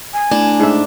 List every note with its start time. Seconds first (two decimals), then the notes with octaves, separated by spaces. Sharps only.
0.13 G#5
0.32 A2 D4
0.60 G#2 E5